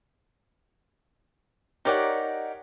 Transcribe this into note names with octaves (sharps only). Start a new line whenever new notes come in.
D#4 G4 A#4 C#5 D5 F#5